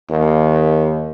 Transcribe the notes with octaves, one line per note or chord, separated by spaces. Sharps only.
D#2